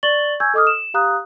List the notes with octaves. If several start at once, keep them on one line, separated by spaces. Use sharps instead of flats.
D5 C#6 A6 F#7 G7
G#5 C#6 E6 G6 G#6
A4 D#5 D6 D#6 F6
E7
G4 F5 A#5 D#6 F#6